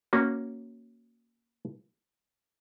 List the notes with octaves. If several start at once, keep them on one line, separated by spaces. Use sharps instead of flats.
A#3 C#4 F#4